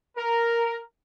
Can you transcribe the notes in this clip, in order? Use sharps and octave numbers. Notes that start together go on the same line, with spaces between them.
A#4